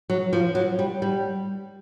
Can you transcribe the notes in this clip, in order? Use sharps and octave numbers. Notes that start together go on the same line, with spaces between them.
F#3
F3
F#3
G3
G3